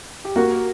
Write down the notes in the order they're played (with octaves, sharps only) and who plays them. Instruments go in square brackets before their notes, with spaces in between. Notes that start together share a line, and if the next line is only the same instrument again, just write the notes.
[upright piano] G4
[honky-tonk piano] A#3 [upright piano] F#4